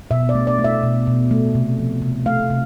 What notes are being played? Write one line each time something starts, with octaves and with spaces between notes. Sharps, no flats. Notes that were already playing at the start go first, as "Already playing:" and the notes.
B2 E5
D5
A3
D5
A3
E5
B2
B2
A3
C3
F3
C3
A3 F5
C3